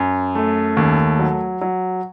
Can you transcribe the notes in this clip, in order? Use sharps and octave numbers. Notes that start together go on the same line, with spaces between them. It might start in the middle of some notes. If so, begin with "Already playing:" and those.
Already playing: F#2
A3
D#2
F#3
F#3